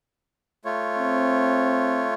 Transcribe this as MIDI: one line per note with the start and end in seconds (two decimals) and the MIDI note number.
0.65 2.14 57
0.65 2.14 65
0.65 2.14 73
0.99 2.09 60